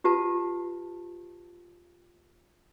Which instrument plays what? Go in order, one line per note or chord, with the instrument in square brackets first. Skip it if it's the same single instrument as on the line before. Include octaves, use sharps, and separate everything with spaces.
[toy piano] F4 G4 B4 A5